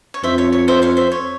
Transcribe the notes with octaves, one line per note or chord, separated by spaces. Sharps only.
C#5
F2 C5 E5
C#5
C#5
C5 E5
C#5 F5
C5 E5
C#5